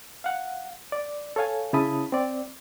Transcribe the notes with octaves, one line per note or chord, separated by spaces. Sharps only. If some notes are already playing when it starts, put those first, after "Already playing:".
F5 F#5
D5
A4 C#5 F5 G#5
C#3 C#4 E4 A5 B5 D#6
C4 D5